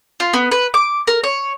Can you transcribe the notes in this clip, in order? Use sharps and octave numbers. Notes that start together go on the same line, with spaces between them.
F4
B3
B4
D6
A#4
C#5